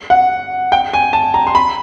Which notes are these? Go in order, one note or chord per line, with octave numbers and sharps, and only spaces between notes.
F#5
G5
G#5
A5
A#5
C6
B5